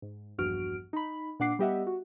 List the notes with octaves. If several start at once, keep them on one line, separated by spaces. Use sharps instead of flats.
G#2
A#1 E2 G2 F#4 F6 D7
D#4 B5
A#2 D4 F#5 D6 C7
G3 B3 G4 D#5 E5 F#5
F#4